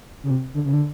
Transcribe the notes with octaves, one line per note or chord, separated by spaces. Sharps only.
C#3
C3
D3
C#3
D3